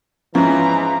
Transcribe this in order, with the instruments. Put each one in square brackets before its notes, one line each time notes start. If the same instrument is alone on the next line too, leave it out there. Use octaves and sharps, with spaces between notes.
[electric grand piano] G#2 F3 [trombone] E3 [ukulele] C#4 [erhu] A#5